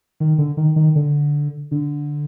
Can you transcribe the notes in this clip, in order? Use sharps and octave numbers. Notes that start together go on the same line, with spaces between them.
D#3
D3
D#3
D#3
D3
D3